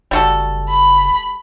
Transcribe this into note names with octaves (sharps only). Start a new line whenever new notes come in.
F#1 G3 F#4 A4
B5